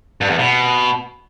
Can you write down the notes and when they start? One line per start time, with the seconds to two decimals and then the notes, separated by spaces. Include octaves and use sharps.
0.21 G2
0.30 E2
0.39 B2